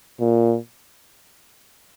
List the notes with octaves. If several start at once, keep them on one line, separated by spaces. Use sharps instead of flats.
A#2